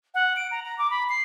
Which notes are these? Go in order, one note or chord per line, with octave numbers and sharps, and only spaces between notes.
F#5
D7
A#5
A#5
D6
B5
C7